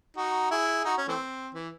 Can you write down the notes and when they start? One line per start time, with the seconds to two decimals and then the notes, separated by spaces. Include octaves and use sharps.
0.16 D#4 F#4
0.51 E4 G#4
0.85 D#4 F#4
0.97 C#4
1.08 E3 A3 C4
1.54 E3